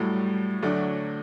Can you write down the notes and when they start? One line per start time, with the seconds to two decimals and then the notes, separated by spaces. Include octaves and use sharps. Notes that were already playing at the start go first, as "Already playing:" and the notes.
Already playing: A2 F#3 G3 A3
0.63 D2 D3 F#3 A3 D4